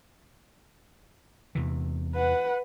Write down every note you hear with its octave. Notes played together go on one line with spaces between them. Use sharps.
E2 C3 E3
B4 F#5